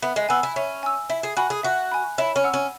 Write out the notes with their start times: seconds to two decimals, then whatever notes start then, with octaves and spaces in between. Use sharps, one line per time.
0.02 B3 E5
0.16 G#3
0.29 B3 G#5 E6
0.43 E4
0.56 C#4 E5
0.83 G#5 E6
1.09 E4 E5
1.23 G#4
1.37 F#4 G#5 B5
1.50 G#4
1.63 F#4 E5
1.92 G#5 B5
2.18 E4 C#5
2.36 C#4
2.44 F#5 E6
2.54 C#4